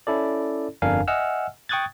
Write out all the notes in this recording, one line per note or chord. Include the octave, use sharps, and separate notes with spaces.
C#4 E4 A4 D5
G1 F2 D4 A#4 F5 G#5
D#5 E5 F#5 G#5 E6 F6
G5 C#6 D#6 F#6 G#6 A6